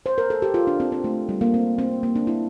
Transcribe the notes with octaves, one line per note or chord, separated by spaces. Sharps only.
C5
A#4
A4
G4
F4
D4
C4
C4
A3
G3
A#3
C4
C4
A#3
D4
E4